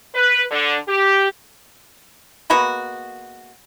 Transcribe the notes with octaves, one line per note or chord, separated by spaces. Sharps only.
B4
D3
G4
G#3 A#3 B3 F#4